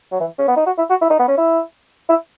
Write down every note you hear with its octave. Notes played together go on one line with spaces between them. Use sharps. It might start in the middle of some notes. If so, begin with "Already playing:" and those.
F#3
E3
C#4
B3
D#4
F#4
E4
F#4
E4
D#4
B3
C#4
E4
E4